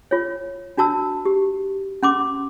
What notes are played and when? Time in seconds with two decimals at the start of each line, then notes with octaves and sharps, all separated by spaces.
0.11 F4 C#5
0.77 D4 F#4 A5 E6
1.25 G4
2.03 C#4 C6 D6